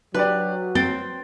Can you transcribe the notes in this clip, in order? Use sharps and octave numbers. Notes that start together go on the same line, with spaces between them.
F#3 D4 G4 B4 D5
C4 G5 A6